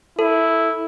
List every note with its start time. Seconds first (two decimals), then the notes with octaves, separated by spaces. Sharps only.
0.19 E4 A4